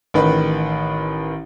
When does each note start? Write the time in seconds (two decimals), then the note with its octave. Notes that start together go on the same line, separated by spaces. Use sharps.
0.14 A1 D#3 B4